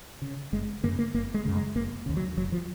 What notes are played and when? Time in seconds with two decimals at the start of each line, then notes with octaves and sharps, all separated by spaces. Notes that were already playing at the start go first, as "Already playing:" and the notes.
0.22 C#3
0.52 F#1 G#3
0.83 F#2 C#3 A#3
0.99 A#3
1.14 F#1 A#3
1.34 G#3
1.45 F#2 C#3
1.55 G#3
1.75 F1 A#3
2.06 D#2 C#3
2.17 F#3
2.37 F1 F#3
2.52 F3